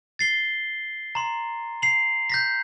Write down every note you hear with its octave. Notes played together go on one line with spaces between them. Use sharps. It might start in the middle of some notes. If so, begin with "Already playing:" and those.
A6 C7 G7
A#5 C6
C7 F7 F#7
G6 A#6 B6